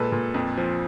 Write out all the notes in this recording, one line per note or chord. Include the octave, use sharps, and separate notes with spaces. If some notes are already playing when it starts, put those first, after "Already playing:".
Already playing: A#2 G#3 A4 B4
A#2
F2
F3